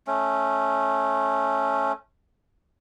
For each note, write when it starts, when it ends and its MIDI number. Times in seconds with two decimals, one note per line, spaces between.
0.07 1.92 57
0.07 1.92 61